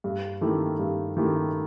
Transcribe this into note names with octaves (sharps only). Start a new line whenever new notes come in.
G2
D#3 A3 E4 G4
G2
D#3 A3 E4 G4